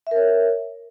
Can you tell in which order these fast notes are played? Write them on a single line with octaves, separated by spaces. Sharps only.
E5 A#4 C#5